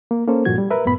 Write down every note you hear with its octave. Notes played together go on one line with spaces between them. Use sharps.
A#3
A#3 C#4 A4 C5
G2 A#2 F3 F#4 G#6
G3
A#4 B4 E5
C#2 F#2 A2 B3 B5